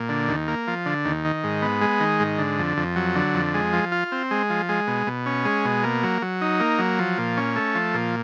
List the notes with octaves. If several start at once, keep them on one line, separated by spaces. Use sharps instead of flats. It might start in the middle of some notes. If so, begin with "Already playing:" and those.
Already playing: A#2
D3
D#2
A#3
F3
D3
D#2
D#3
G#2
B3
G#3
D#3
G#2
D3
F2
F2
F#3
D3
F2
G#3
F3
F4
C4
G#3
F3
G#3
B2
B2
C#4
G#3
B2
A#3
F#3
F#3
D#4
A#3
F#3
F3
A#2
C#4
A3
F3
A#2